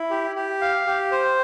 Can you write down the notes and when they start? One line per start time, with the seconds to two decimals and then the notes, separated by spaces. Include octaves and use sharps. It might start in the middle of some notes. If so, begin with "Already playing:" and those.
Already playing: E4
0.11 G4
0.36 G4
0.61 F5
0.86 G4
1.12 C5